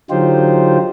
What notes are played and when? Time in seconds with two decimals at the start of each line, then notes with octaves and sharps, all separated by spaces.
0.10 D3 F#3 D#4 F4 G4 C5